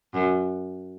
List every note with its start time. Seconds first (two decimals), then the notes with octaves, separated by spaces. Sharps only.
0.14 F#2